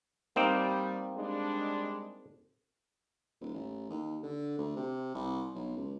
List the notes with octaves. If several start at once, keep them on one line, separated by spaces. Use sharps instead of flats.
G3 A#3 C4 D#4
G3 G#3 D4
D#1
A1
D#2
D3
D2
C3
C2
B1
C#2